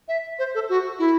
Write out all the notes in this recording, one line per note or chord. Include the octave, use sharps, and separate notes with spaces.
E5
C5
A4
F#4
E4